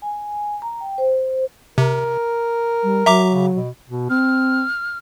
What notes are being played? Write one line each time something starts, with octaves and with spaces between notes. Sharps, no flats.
G#5
A#5
G5
C5
C3 A#4
G3
F#3 E5 A#5 D6
C#3
B2
B2
C4 F6